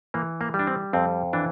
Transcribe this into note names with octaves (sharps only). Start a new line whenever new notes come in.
E3 A#3
A#3
G3
D4
C4
F2 C4
E3 D4